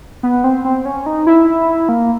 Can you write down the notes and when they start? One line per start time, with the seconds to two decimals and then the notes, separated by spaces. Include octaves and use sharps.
0.23 B3
0.44 C4
0.65 C4
0.86 C#4
1.06 D#4
1.27 E4
1.89 A#3